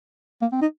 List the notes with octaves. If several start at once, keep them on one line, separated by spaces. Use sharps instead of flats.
A#3
C4
D#4